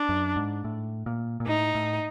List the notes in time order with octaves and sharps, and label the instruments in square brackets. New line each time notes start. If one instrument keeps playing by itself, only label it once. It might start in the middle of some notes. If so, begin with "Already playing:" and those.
Already playing: [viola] D4
[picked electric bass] F#2
G#2
A2
A#2
A#2
[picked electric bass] A2 [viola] D#4
[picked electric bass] A2